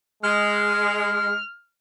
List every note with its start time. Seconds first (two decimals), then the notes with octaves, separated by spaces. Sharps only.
0.23 G#3 F6